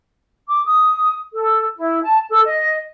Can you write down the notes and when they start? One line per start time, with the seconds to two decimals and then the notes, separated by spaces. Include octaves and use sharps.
0.48 D6
0.66 D#6
1.32 A4
1.76 E4
2.03 A5
2.30 A4
2.45 D#5